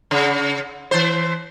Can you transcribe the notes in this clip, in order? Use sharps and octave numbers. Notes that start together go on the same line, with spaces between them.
C#3
E3 C5